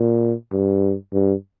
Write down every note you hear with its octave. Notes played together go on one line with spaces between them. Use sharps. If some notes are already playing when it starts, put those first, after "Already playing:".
Already playing: A#2
G2
G2